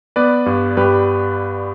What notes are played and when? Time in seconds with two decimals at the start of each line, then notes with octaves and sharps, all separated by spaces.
0.16 B3 B4 D5
0.46 G2
0.77 G2 G4 B4